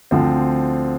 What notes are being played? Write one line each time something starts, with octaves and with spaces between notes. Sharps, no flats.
D2 D3 F3 C4